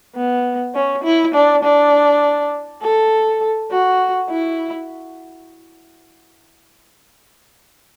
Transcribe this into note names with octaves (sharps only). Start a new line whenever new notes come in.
B3
C#4
E4
D4
D4
A4
F#4
E4